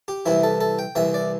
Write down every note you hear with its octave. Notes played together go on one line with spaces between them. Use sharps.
G4
C2 C3 E3 E4
A4
A4
G5
C2 C3 E3 E5
D5